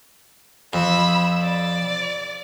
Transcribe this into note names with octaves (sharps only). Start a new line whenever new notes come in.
F2 B5 E6
D5